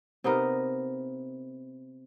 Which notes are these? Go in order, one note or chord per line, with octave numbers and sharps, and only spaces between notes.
C3 B3 D#4 A#4